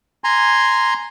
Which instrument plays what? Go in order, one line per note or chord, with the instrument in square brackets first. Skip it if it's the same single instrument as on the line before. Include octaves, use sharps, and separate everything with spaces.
[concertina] G#5 A#5 C6